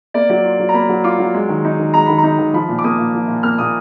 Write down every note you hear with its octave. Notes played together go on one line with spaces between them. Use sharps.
A#3 D5
F#3 D5
F4
F#3
A#5
A#3 B5
F#3
F4 D6
F#3
G#3
D#3
D#4
D#3
G#3 A#5
D#3 B5
A#5
D#4
D#3
F3 B5
A#2
D6
A#3 D#6
A#2
F3
A#2
A#3 F6
A#2 D#6